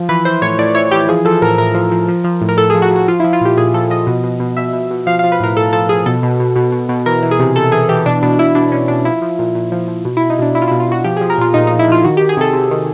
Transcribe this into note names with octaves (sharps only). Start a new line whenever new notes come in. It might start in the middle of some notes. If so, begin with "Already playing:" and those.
Already playing: F3
E3 B4
E3 C5
A2 C#5
A2 D5
E3 C#5
E3 G4
F3 G#4
F3 A4
A2 A#4
A2 A#4
F3
F3
F3
F3
A2
A#4
A2 A4
F3 G#4
F#4
F3
F#4
F3 F4
F3 E4
F4
A#2 G4
A#2 G#4
F3 A4
F3 D#5
B2
B2
B2
B2 E5
B2
B2
F3 F5
F3 F5
B4
A2 A#4
A2 A4
F3 A4
F3 G#4
B2 A4
B2
B2
B2
B2
B2
E3 A#4
E3
G#4
C3
C3 A4
E3 G#4
E3 G4
B2 D4
B2 D4
B2 E4
B2 D4
B2 C#4
B2 D4
F3 E4
F3
A#2
A#2
F3
F3
B2
B2 E4
D#4
B2 D4
B2 E4
F4
B2 E4
F4
B2 F#4
F3 G4
F3 G#4
A#4
A#2 F4
A#2 D#4
F3 D#4
E4
F3 F4
D#3 F#4
D#3 G4
G#4
C3 A4
C3
D#3